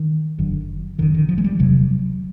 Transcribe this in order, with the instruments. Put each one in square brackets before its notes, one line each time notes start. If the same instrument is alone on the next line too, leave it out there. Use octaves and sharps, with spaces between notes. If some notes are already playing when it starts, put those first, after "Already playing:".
Already playing: [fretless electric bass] D#3
F#1 F#2 D3
F#1 F#2 D3 D#3
D#3
F3
G#3
G3
E1 D2 C3 F#3